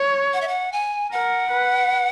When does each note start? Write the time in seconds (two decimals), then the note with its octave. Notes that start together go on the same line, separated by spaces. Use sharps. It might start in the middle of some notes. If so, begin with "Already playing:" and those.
Already playing: C#5
0.33 F#5
0.41 E5
0.48 F#5
0.72 G#5
1.12 A#4 F#5
1.50 B4